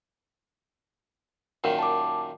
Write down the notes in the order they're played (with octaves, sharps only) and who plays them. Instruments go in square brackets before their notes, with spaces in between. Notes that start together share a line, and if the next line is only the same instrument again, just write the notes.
[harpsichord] F#2 A#2 D#3
[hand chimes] A5 D6